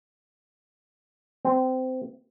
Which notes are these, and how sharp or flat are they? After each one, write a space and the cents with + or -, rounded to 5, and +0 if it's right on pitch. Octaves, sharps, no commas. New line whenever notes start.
C4 -20